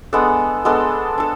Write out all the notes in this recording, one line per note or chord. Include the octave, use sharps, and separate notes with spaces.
G#3 B3 D4 A4
G#3 B3 D4 A4
D4 A4